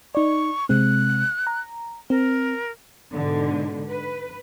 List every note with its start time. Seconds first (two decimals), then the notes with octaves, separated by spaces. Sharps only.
0.15 D#4 D5 C#6
0.69 C3 G#3 C4 F#6
1.47 A#5
2.10 C4 A#4
3.13 G#2 B2 D3
3.90 B4